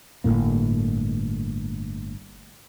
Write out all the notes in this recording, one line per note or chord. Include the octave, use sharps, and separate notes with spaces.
G1 D#2 A2 A#3